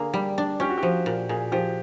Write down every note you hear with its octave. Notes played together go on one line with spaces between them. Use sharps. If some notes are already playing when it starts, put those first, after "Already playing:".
Already playing: D3 A#3 G#4
G3
D4
C#4 G4
F#4
G4
F3
A#2
A#2 G#4
F3 G4